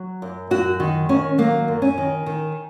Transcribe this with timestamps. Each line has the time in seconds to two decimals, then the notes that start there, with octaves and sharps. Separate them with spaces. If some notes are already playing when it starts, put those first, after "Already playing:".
Already playing: F#3
0.22 F#2
0.51 F#2 F#4
0.80 D#3
1.09 D#3 C#4
1.38 F#3 A#3
1.68 F#2
1.82 C#4
1.98 D#3
2.26 D#3